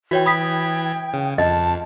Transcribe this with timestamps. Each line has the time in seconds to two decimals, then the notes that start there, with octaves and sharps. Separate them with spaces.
0.11 E3 F#4 C#5 G5 G#6
0.25 G5 B5 D#6 B6
1.14 C#3
1.38 F2 D#5 A5